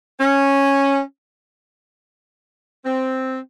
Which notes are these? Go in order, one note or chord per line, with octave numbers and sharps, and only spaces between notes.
C#4
C4